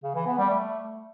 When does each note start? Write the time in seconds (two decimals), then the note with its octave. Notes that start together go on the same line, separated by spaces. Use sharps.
0.03 C#3
0.15 E3
0.27 B3
0.38 G3
0.50 A3